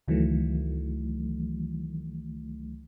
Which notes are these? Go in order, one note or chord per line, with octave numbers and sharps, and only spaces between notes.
C#2 D#3 E3 F#3 A3